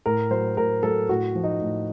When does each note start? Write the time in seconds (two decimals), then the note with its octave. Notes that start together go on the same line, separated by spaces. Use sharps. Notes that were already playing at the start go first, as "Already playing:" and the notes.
0.06 A2 A#4
0.31 F#3 C5
0.57 A2 A#4
0.83 F#3 A4
1.09 A2 F#4
1.35 F3
1.44 D#4
1.61 A2